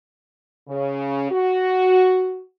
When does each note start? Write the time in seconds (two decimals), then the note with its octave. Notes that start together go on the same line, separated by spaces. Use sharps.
0.68 C#3
1.30 F#4